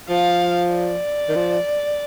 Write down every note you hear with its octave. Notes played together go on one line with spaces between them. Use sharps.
F3 F5
D5
D#3
F3